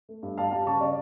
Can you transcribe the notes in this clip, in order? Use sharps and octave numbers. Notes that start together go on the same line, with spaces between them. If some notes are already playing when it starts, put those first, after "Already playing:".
A3
G2
G3 F5 A5
G3 F5 A5
C#3 A5 C#6
C#3 D5 F5